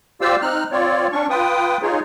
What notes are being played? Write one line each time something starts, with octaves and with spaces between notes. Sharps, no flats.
F4 G4 C5 D5 F5 E6
C4 D#4 F6 F#6
C4 F4 C#5 D5
C#4 D4 C#6
F4 B4 G5 D#6
D#4 F4 G#4 C#5